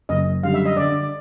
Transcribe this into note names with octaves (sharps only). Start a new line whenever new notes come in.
F#1 D#5
F#2 D3 G3 F5
E5
D#5
D3 D5